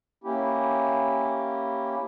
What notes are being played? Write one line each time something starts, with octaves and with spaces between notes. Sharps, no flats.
A#3 C#4 E4 G4